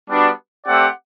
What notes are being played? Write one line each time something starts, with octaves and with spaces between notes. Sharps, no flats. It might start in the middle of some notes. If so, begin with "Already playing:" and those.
G3 B3 D4 F#4
A3 C4 G4 D5 F#5